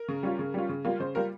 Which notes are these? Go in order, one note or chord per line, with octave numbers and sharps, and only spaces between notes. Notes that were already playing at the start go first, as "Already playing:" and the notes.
Already playing: A#4
C#3
G3 C#4 F4
C#3
G3 C#4 F4
C#3
G3 A#3 F4
C#3 C5
G3 A#3 F4 A#4